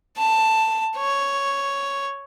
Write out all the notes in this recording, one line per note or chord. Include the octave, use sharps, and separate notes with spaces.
A5
C#5